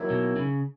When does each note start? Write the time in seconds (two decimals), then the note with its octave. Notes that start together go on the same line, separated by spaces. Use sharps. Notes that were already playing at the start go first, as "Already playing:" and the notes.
Already playing: D#3 F#3 A#3 E4
0.10 B2
0.36 C#3